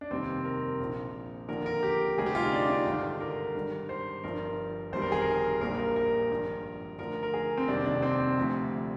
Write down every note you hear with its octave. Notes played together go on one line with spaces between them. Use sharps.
D4
F1 D#2 D#3 G3 C4
A#4
A#1 A#2 F3
D#2 D3 F3 A#4
A#4
G4
D2 C3 G3 G#4
G4
F4
D#4
D4
D4
G#1 G2 D3
A#4
G#1 G2 D#3 G3
C5
G1 G2 F3 A#4
G1 F2 D#3 G3 C5
A#4
G#4
A#4
A#1 A#2 G3 A#4
A#4
A#4
G#1 G2 F3
D2 D3 F3 A#4
A#4
G#4
C4
F1 D#2 D#3 G3 D4
D4
C4
D2 C3 F3